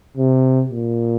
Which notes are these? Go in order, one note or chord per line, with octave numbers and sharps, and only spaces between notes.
C3
A#2